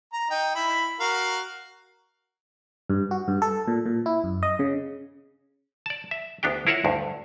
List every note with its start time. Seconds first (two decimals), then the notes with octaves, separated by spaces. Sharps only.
0.13 A#5
0.31 D#4 G5
0.55 E4 B5
1.00 F#4 A#4 F5
2.90 G2
3.11 F#4
3.28 G2
3.42 A4
3.68 A#2
3.86 A#2
4.06 E4
4.24 F#2
4.43 D#5
4.59 C#3
5.86 D5 A5
6.11 E5
6.43 D2 B3 D4 G4 G5
6.67 E4 F4 A#4 C#5 E5 F#5
6.85 D2 G2